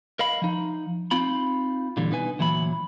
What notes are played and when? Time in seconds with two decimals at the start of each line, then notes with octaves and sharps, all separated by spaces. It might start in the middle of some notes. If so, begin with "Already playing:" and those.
0.19 A#4 D#5 F5 B5
0.42 F3 D#4
1.11 C4 D#4 F4 B5
1.97 A#2 D3 E3 G3
2.11 B2 D#4 B4 G#5
2.39 D2 A#2 E3 F#3 B5